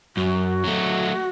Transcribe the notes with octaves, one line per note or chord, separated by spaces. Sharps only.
F#2 F#4
F#3 A3